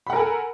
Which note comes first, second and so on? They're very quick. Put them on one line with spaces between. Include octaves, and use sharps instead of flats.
B5 F#5 A#4 G#5 A4